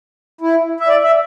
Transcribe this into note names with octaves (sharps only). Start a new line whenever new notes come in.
E4
E5
D5
E5